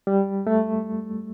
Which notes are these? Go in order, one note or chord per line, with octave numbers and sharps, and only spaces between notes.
G3
A3